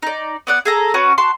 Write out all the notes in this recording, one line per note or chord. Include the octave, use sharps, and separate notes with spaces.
D#4 D5
B3 D5 F#5
G#4 A4 A#5
C#4 F#4 B4
F#4 A5 C6